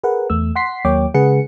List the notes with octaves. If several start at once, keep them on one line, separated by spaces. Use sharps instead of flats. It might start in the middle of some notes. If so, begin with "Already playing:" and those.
G#4 A#4 B4 F#5
E2 A3 E6
F#5 C6 B6 C7
D#2 F#3 A#3 C#5 G5 D6
C#3 G#3 G#4 B4 F#5 C#7